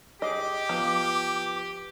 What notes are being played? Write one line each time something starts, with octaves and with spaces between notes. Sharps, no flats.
G4 G#4 D#5 D6
F3 B3 F4